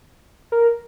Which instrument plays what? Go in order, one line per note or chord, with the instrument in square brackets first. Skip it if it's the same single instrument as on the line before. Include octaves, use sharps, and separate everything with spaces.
[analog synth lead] A#4